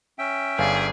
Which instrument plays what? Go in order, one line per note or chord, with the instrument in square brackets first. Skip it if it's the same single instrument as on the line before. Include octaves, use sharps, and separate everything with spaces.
[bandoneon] C#4 E5 G5
[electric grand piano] G1 F5 A6 [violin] G#4 D5